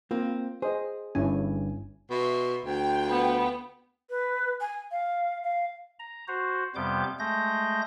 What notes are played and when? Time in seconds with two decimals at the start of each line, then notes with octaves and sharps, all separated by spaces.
0.11 A#3 C4 F4
0.62 G#4 C5 D#5
1.15 G1 G2 C#4 E4 G#5
2.10 B2 E5 C6
2.65 D2 F4 G5
3.09 B3
4.10 B4
4.61 G#5
4.91 F5
5.43 F5
5.99 A#5
6.28 F#4 C5
6.75 F2 C3 G3 B3 D6 G6
7.19 G#3 A3 G6 A#6